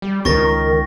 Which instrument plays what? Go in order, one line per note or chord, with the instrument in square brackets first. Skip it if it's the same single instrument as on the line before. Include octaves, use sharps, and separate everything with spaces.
[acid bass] G3
[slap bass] C#2 [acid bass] D#3 [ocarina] A#4 [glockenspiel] C#6 A6 A#6